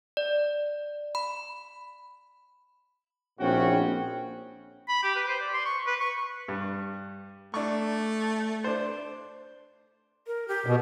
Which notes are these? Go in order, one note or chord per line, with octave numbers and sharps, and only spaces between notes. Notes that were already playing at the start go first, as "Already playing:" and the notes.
D5
B5
A#1 A2 C4 C#4 F#4 G5
B5
G4
B4
C5
D5
C6
C#6
B4
C#6
G2
A3 D4 C#6
D4 C5
A#4
G4
B2